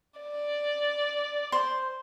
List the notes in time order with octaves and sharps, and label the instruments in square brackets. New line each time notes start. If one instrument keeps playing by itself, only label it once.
[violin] D5
[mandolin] C5